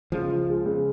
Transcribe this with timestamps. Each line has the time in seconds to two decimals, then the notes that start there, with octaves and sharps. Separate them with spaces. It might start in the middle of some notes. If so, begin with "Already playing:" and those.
0.12 C#2 F3
0.30 F4
0.49 G#3
0.65 C#2